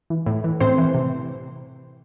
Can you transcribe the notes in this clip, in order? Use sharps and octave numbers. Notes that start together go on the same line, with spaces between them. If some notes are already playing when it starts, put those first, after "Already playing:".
E3
A2
E3
A2 C4 C5
E3
C3